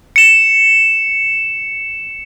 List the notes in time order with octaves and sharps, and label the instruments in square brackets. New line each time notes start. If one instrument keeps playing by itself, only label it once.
[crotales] C#7 E7